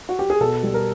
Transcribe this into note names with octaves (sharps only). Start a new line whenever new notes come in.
F#4
G4
G#4
B2 A4
G3
A#4